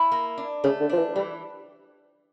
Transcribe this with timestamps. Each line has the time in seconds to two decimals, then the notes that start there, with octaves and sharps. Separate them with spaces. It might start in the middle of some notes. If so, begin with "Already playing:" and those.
Already playing: E4
0.12 A#3
0.38 D4
0.64 C#3 A3
0.81 D3
0.89 F3 D4
0.98 E3
1.15 E3 G3